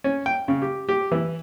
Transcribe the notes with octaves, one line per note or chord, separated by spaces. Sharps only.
C#4
G5
C#3
G4
G4
E3